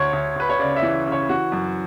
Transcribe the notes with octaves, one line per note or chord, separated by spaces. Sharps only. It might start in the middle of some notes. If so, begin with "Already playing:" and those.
Already playing: D2 C#5
D2
D2 B4
C#5
C#3 D5
E5
E3
C#3
C#5
E3 F#4
F#2